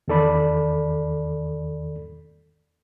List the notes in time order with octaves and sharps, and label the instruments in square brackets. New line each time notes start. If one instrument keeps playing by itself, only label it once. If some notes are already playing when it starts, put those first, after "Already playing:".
[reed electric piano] E2 D#3 A4 D5 B5